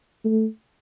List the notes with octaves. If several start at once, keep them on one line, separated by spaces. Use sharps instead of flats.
A3